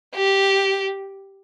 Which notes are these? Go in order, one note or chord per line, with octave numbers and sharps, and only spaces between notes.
G4